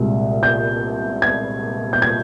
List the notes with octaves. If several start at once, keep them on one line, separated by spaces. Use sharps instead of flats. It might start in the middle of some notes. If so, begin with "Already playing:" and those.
Already playing: C2 A#2 G#3
G6
G#6
G6
G#6